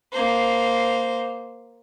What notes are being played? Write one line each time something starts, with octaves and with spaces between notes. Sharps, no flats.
A#3 C5